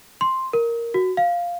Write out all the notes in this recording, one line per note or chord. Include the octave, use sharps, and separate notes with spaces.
C6
A#4
F#4
F5